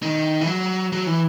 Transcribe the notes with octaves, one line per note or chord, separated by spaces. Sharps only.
D#3
E3
F#3
F#3
E3